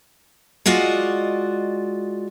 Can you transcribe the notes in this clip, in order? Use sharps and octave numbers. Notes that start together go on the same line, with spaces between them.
G#3 F4 F#4 D5 D#5